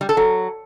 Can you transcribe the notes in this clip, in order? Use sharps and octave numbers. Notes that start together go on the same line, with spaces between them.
G3
A4
F#3